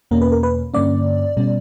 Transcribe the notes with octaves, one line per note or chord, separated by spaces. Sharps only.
E2 B2 A#3 C#4 A#4
B4
A#4
B4
G2 D3 A#3 C#4 D5
B2 G3 C#4